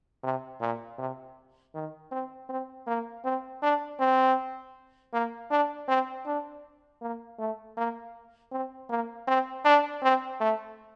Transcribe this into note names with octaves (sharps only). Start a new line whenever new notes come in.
C3
A#2
C3
D#3
C4
C4
A#3
C4
D4
C4
A#3
D4
C4
D4
A#3
A3
A#3
C4
A#3
C4
D4
C4
A3